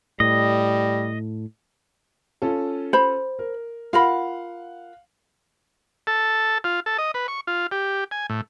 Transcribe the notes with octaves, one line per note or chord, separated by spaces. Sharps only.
A2 G3 D#5
C#4 F4 A4
C5 B5
A#4
F4 A#4 F5 F#5 B5
A4
F4
A4
D#5
B4
C#6
F4
G4
G#5
A2